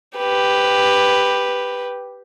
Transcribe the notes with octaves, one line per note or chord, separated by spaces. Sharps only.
G4 B4